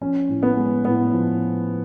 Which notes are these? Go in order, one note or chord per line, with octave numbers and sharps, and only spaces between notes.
F3 C#4
A2
B3
G#3
A2 B3
F3